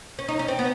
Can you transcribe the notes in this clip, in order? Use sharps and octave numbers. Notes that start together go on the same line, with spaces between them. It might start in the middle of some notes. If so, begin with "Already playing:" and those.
C#4
D#4
C#4
C4
B3